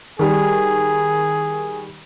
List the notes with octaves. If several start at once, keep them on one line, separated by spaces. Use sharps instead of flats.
D#3 G3 G#4